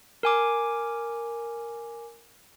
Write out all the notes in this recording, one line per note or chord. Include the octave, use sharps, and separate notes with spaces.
A#4 G#5 D6